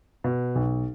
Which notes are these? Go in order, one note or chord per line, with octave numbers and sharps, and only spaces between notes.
B2
B1